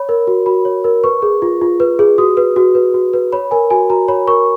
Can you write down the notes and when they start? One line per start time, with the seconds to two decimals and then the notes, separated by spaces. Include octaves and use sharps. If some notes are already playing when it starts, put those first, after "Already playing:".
Already playing: C#5 B5
0.09 A#4
0.27 F#4
0.46 F#4 B5
0.65 C#5
0.84 A#4
1.04 B4 C#6
1.22 G#4
1.42 F4
1.61 F4
1.80 B4
1.99 G#4
2.18 F#4 D#6
2.37 B4
2.56 F#4
2.75 B4
2.94 F#4
3.13 B4
3.32 C#5 B5
3.51 A#4 G#5
3.70 F#4 G#5
3.90 F#4 A#5
4.08 C#5 B5
4.27 A#4 C#6